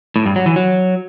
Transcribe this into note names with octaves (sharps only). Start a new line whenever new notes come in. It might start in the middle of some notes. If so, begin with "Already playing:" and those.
A2
G2
F#3
E3
F#3